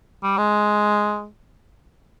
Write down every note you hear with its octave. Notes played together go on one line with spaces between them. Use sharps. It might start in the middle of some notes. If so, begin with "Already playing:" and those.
G3
G#3